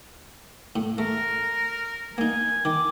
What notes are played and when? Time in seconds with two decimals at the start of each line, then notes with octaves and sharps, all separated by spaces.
0.76 A2
0.98 A3 A#4
2.18 A#3 D#4 G#5
2.65 D#3 D6